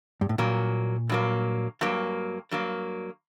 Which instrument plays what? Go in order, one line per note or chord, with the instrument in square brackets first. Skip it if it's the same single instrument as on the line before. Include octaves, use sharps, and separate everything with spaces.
[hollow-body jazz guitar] G2
A2
[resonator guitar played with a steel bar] G2 F#3 A#3 [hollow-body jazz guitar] A#2
[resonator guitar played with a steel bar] G2 F#3 A#3
G2 F#3 A#3
G2 F#3 A#3